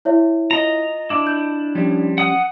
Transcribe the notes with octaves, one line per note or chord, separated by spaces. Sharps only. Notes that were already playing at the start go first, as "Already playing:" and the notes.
E4 C#5 E5
F4 D#5 A#5
D4 E4 D6
G6
F3 G3 C#4
F#5 D#6